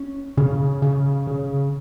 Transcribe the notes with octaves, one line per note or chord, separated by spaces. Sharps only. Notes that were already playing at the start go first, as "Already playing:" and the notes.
Already playing: C#4
C#3
C#3
C#3